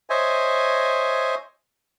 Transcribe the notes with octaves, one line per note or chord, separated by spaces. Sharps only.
C5 C#5 D#5 E5 G#5